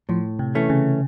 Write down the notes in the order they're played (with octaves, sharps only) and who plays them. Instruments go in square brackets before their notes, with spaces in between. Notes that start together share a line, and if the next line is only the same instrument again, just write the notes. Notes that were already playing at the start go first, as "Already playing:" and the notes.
[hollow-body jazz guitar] A2 [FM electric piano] F3
[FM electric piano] C3
[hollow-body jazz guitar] E3 A3 C#4
[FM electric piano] C#3